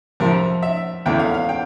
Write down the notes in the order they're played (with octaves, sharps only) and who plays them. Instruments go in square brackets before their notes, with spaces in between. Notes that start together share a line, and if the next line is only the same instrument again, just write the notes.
[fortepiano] F2 C3 F3 A#4
E5
E2 E3 A3 G5
F5
F5
G5